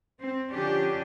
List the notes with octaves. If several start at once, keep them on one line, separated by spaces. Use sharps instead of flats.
C4
D3 F3 C#4 D4 G4